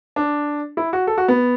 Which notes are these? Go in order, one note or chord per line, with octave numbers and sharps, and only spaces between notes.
D4
E4
F#4
A4
F#4
B3